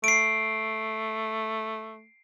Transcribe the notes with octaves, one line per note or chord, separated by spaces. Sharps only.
A3 C7 D7